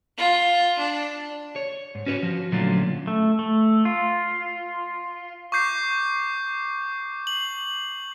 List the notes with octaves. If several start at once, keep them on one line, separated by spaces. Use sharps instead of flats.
F4
D4
C#5
G#2
C#4 F#4 B4 C#5
F3 F#4
A#2 D3 F#3 A3 C#4 F4
A3
A3
F4
C#6 D6 G6 C7
F#7